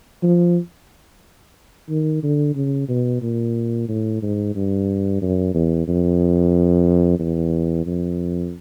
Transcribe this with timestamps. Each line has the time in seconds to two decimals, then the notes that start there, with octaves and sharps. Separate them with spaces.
0.23 F3
1.89 D#3
2.23 D3
2.55 C#3
2.88 B2
3.22 A#2
3.88 A2
4.22 G#2
4.55 G2
5.22 F#2
5.54 E2
5.87 F2
7.19 E2
7.86 F2